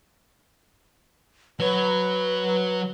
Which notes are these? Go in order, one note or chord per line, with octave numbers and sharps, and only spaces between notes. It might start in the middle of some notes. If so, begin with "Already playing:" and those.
F#3 B4 C#5